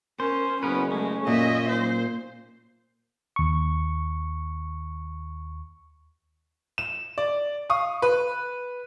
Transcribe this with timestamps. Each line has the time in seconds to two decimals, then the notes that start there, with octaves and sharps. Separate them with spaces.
0.20 C#4 A#4 C5
0.63 F#1 B3 C#4 A#4 B4
0.92 G#3 A3 C#4
1.27 F#2 A#2 D#5 E5
1.69 F#3 D#4 A#4 C5
3.36 D#2 C#6
6.78 E7
7.18 D5
7.70 F5 C#6 D#6
8.02 B4